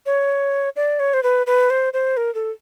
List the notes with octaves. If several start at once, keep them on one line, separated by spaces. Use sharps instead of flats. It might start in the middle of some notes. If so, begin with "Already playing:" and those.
C#5
D5
C#5
C5
B4
B4
C5
C5
A#4
A4